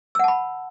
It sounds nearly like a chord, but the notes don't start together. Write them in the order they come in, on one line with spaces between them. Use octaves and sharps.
E6 F#5 A5 B5